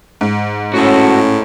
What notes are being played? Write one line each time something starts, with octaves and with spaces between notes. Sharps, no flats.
G#2
A2 C#4 F#4 A4